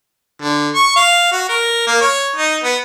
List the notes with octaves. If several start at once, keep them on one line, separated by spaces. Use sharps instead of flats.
D3
C#6
F5
F#4
A#4
A#3
C#5
D#4
B3